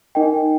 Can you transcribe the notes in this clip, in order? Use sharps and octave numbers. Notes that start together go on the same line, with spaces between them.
D#4 A#4 D#5 G5